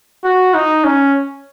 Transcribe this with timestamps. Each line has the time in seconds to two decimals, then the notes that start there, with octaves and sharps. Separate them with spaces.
0.24 F#4
0.54 D#4
0.84 C#4